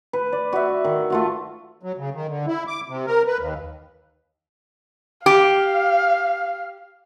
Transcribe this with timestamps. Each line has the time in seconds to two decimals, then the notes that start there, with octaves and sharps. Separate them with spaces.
0.13 B4
0.32 D5
0.52 F#4 B4 E5
0.84 D#3
1.10 A3 F4 F#4
1.83 F#3
1.98 C#3
2.14 D#3
2.28 D3
2.47 E4
2.67 D6
2.89 C3
3.07 A#4
3.26 B4
3.39 D#2
5.26 G4 F5